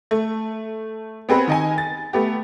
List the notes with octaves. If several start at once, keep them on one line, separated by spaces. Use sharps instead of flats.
A3
B3 C4 G#4 B4
D#3 D#5 G#5
A6
A3 B3 G4